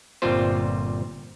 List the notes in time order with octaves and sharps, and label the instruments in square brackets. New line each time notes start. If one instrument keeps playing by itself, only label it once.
[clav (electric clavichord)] G1 A#2 G3 C4 F4 C5